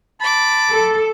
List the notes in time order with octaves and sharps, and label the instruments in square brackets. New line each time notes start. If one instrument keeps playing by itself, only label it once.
[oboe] A5 [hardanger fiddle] B5 D6
[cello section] A4